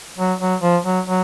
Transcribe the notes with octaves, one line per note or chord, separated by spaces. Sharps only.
F#3
F#3
F3
F#3
F#3